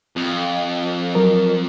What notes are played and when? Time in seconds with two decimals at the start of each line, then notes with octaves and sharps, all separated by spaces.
0.16 F2
1.15 F#3 A#4